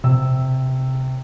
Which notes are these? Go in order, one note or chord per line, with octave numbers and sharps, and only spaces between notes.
C3 E6